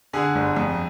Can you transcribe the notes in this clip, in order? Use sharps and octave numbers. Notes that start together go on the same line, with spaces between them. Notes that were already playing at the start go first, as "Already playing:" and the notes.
D3 G#4
G1
F2